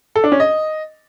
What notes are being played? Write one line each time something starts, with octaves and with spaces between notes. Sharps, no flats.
A4
D4
C#4
D#5